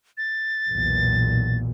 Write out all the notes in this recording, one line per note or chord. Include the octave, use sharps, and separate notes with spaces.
A6
B1 E2 A#2